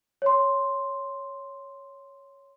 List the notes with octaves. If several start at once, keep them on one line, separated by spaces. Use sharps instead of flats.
C#5 C6